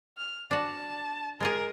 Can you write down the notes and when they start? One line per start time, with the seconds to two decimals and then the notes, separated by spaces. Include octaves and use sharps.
0.18 F6
0.51 D4 F#4 A5
1.40 G#3 F4 G#4 A#4